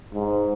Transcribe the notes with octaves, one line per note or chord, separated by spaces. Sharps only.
G#2